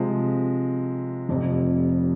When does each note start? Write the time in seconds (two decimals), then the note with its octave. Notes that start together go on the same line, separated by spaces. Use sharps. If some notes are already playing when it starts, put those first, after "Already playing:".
Already playing: C3 F3 G#3
1.29 F1 F2 C3